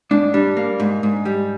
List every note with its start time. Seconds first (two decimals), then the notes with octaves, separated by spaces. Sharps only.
0.11 G#2 D4
0.34 G3 D4
0.57 A#3
0.80 G#2
1.03 G#2
1.25 G3